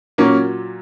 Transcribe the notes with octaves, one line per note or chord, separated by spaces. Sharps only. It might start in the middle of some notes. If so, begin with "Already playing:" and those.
A#2 F#3 A#3 C#4